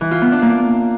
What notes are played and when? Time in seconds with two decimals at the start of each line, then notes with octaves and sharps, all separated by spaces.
0.01 E3
0.11 F4
0.22 B3
0.32 D4
0.42 A#3